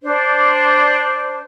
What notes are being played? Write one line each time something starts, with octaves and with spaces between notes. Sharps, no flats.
D4 C5